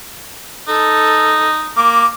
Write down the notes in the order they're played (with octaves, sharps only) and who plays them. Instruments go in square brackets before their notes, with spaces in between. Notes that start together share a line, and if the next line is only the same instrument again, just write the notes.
[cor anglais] D#4 [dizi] A4
[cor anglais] A#3 [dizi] D6